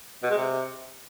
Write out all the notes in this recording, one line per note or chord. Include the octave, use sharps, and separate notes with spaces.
B2
G#3
C3